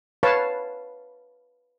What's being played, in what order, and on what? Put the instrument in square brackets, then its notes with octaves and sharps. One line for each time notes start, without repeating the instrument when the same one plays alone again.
[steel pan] B4 C#5 F5 A5